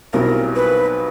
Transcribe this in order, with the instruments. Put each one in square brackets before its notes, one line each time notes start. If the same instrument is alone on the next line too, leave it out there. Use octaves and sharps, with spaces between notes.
[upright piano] B1 B2 G3 C4 E4 [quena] A#4
[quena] B4